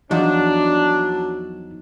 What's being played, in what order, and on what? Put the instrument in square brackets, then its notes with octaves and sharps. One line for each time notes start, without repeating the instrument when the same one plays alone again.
[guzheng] E2 F3 A5 [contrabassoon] F#3 [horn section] D4 [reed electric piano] D#4